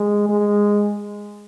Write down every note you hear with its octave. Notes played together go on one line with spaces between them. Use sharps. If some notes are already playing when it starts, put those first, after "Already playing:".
Already playing: G#3
G#3